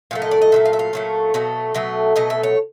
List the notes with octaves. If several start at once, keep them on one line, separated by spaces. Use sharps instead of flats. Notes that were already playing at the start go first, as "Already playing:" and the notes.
A#2 F#3 A3 F5
D#5
D5
D#5
A#2 F#3 A3 E5
F5
E5
F5
A#2 F#3 A3
B2 F#3 A3
B2 F#3 A3 E5
B2 F#3 A3 D#5
E5
C#5